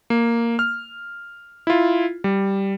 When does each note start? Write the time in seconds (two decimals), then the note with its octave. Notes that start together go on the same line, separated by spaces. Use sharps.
0.10 A#3
0.59 F6
1.67 E4 F4
2.24 G3